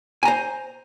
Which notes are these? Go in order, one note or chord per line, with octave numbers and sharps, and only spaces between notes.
C5 G#5 A#5